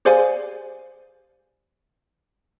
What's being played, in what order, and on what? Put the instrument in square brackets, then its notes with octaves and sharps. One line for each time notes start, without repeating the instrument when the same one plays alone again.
[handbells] G4 G#4 C5 D5 F5 G#5